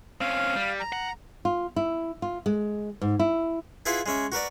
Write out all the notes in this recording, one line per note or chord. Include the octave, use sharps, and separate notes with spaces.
C4 C#4 F5
G3
A#5
F#5
F4
E4
F4
G#3
G#2
E4
E4 F4 G#4 B4 E5 F#5
G#3 C#4 E5
F#4 A#4 B4 D5